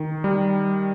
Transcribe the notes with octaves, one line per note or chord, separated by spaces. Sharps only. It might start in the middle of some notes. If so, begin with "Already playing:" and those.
Already playing: D#3
G3